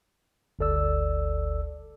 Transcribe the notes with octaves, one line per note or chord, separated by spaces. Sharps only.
G1 D2 A4 D5 E6